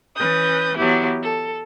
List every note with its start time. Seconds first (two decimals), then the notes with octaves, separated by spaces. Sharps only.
0.15 E3 C#4 B4 D#6 G6
0.76 E3 F#3 B3 E4 G4
1.21 A4